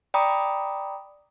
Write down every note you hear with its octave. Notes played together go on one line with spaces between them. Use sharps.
D5 G5 A#5 B5 D6 D#6